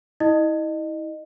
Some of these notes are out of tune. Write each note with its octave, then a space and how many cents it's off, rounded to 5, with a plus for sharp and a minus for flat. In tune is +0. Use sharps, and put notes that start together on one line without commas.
E4 -35 D#5 -25